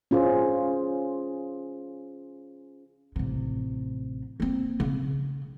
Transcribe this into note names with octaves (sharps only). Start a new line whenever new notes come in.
C#4 F4 G#4 C5
A1 C3
A#3 C4
C#3